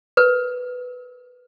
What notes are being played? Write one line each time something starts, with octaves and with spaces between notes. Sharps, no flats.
A#4 B4